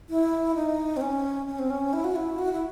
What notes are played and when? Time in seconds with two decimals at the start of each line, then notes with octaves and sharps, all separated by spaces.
0.10 E4
0.55 D#4
0.97 C4
1.01 C#4
1.47 C#4
1.59 C4
1.70 C#4
1.93 E4
2.04 F#4
2.16 E4
2.38 F#4
2.52 E4